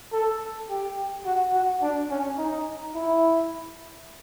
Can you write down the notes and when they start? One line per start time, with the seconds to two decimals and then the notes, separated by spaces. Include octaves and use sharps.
0.12 A4
0.70 G4
1.26 F#4
1.54 F#4
1.82 D4
2.10 C#4
2.38 D#4
2.95 E4